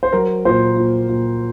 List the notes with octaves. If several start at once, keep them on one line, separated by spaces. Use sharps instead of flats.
C5
F#3 A#4
A#2 C5
A#2
A#2